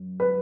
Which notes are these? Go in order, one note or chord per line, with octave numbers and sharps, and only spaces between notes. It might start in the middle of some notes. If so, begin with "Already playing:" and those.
Already playing: F#2
B4